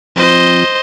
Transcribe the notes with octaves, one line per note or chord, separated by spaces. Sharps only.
F3 C4 F4 C5 D#5